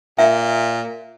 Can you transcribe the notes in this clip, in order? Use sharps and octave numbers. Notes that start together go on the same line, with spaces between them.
A#2 E5